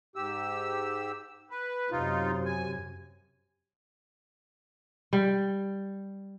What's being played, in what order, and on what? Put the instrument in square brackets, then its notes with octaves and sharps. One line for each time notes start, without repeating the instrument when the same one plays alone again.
[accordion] G#2 G4 E6
B4
[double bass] F#2 C3 [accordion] D#4 F4
[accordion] G#5
[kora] G3